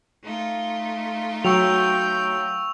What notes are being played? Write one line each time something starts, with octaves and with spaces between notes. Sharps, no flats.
A3 D#4 F4
F#3 G5 C#6 E6 F7